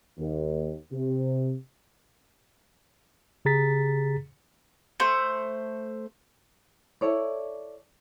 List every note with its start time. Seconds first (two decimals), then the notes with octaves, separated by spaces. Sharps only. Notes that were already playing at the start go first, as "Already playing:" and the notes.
0.18 D#2
0.92 C3
3.45 C#3 G4 G#4 A#5 A6 B6
5.00 A3 C5
7.01 E4 A4 C#5 D5